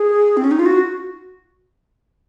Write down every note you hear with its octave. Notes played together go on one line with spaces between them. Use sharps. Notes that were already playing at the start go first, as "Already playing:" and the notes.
Already playing: G#4
C4
C#4
D#4
F4
F#4